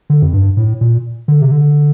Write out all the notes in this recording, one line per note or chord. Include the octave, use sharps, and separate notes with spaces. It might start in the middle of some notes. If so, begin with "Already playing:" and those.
D3
F2
G2
A2
A#2
D3
C3
D3